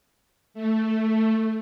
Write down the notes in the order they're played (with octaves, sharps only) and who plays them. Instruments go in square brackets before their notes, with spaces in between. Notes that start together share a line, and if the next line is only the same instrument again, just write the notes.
[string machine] A3